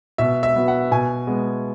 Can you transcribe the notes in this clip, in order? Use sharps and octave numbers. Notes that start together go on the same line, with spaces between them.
B2 E5
E5
F#3 B3
F#5
B2 G#5
G#3 B3